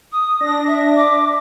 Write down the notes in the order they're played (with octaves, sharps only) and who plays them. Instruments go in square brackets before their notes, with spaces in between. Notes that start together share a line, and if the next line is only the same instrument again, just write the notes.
[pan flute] D#6
[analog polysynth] D4 A#6
[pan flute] E5
D6